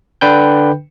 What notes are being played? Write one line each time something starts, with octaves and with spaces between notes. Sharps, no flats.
D3 D4 B4 G5 G6